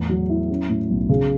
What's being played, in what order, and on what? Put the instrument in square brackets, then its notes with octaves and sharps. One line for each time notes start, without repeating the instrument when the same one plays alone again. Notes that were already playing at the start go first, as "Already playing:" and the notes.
Already playing: [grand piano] E2 A2 B3
F#3
E4
C#4
A2
B1
C#3